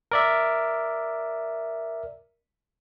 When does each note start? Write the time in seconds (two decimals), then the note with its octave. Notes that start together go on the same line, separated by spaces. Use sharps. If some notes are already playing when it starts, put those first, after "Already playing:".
0.11 A#4 D5 E5